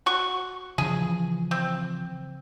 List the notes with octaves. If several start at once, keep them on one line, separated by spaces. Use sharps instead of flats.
F#4 C#6
C#3 E3 F3 G#4
C4